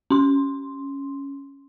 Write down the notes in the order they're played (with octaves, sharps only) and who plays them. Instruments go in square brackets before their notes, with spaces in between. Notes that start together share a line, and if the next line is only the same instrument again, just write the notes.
[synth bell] C#4 C6